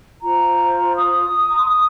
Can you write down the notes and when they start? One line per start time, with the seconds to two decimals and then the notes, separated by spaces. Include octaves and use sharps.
0.21 F4 C5 A#5
0.94 D#6
1.49 A#5
1.58 C6
1.68 D#6